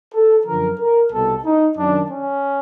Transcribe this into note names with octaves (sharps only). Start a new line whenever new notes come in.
A4
F#2 D3 F3 A#4
A#4
C2 B2 A4
D#4
F#2 D#3 D4
C#4